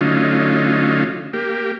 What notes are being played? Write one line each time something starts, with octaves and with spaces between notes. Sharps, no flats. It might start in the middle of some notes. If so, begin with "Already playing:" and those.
D3 F#3 A3 C#4 D#4 F4
A#3 G4